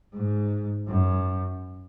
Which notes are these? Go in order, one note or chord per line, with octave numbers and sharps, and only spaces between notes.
G#2
F#2